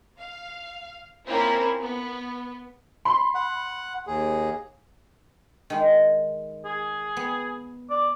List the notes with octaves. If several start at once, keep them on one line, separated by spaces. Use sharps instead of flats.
F5
A#3 C4 C#4 E4 F4 A#4
B3
B5 C6
F#5
D#2 G#4
D#3 G#3
G#4
B3
D5